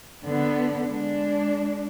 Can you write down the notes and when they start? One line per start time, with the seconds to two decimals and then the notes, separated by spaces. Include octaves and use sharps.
0.23 D3 B3
0.88 G#3 D4